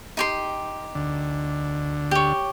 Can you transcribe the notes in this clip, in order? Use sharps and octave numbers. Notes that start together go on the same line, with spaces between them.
D#4 G4 C6
D2 D3
G4 C#5